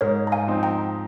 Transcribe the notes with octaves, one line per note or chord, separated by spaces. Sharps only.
G#2 A#4 C#5
A#5
F5 G#5
F3 C4 D#4
G5 A#5